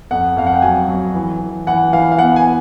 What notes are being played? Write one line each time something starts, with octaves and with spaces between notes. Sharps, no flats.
F2 F#5
F2 F5
F#5
G5
F#3 G#5
F#3
E3
E3
E3 F#5
E3 F5
F5
B3 F#5
G#5